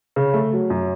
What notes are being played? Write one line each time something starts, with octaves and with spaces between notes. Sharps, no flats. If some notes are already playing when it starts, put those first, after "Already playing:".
C#3
A3
F#3
F#2